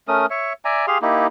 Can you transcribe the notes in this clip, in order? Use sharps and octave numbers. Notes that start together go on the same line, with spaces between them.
A3 C#4 A#4 D#6
C#5 E5
D5 E5 G#5 A#5
G4 G#4 F5 C6
A#3 D#4 E4 G4